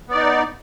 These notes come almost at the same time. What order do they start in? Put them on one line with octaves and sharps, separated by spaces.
B3 D5 D#4